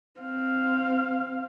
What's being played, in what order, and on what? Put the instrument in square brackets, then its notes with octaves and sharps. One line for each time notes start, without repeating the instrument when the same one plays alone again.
[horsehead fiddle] C4 F5